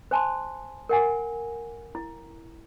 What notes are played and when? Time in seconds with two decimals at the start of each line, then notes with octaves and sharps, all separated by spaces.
0.11 C5 G#5 A5 C6
0.89 A#4 F#5 G#5
1.95 E4